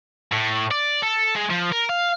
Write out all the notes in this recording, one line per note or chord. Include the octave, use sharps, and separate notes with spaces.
A2
D5
A4
G#3
F3
A#4
F5